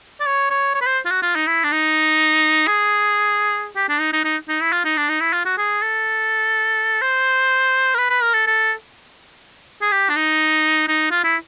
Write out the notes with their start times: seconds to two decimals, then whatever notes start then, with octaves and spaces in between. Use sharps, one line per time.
0.20 D5
0.26 C#5
0.50 C#5
0.75 C#5
0.81 B4
0.86 C5
1.06 F4
1.10 F#4
1.22 F4
1.36 D#4
1.47 E4
1.64 D4
1.72 D#4
2.67 G#4
3.76 G4
3.89 D4
4.00 D#4
4.13 D#4
4.24 D#4
4.48 D#4
4.61 E4
4.72 F4
4.85 D#4
4.97 D4
5.09 D#4
5.20 E4
5.33 F4
5.45 F#4
5.58 G#4
5.82 A4
7.02 C5
7.95 A#4
7.98 B4
8.10 B4
8.22 A#4
8.34 A4
8.47 A4
9.82 G#4
9.92 G4
10.09 D4
10.16 D#4
10.88 D#4
11.11 F4
11.24 E4